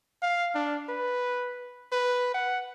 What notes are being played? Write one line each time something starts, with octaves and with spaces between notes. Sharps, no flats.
F5
D4
B4
B4
F#5